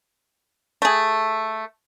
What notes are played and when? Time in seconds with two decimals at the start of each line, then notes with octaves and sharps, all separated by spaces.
0.82 A3 G#4